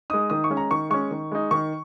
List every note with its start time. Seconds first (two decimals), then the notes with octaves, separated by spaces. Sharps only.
0.10 G#3 D#4 D#6
0.30 D#3 D#6
0.44 C#6
0.50 G#3 C#4
0.57 A#5
0.71 D#3 C#6
0.90 G#3 C#4 C#6
1.11 D#3
1.31 G#3 D#4
1.51 D#3 C#6